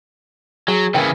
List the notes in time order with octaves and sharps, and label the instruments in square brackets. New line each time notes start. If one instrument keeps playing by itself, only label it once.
[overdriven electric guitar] F#3 [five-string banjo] G#4
[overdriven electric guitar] C#3 E3 [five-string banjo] A#3 G5